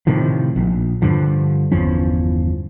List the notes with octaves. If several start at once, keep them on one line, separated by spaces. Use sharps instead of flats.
A2 C3 D#3 F3
A#1
G2 D3 F3
G1 E2 F3 C#4